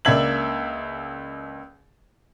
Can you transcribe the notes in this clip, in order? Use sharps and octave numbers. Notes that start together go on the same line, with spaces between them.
C#2 A#3 D4 E5 G#6 F#7